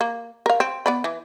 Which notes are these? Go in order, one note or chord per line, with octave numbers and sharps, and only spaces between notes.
A#3
A#4 F5
C4
B3 D5 B5
E3